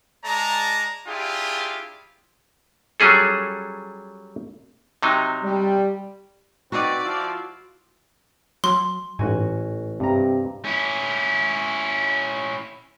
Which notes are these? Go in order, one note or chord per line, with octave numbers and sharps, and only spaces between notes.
G#3 D5 A5 A#5
D4 E4 F4 G4 G#4
F#3 G3 C#4 G#4 A4
C3 F#3 D#4
G3
C4 D#4 F#4 B4 D5
F3 E4 F4
F#3 C6
A1 G#2 F#4 G#5
G2 C3 A#5
C#4 E4